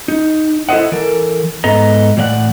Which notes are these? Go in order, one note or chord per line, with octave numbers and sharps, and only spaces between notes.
D#4
E4 A4 C5 D#5 F#5
E3 A4 A#4
G#2 B3 A4 D#5 A#5
A2 E3 D5 D#5 F#5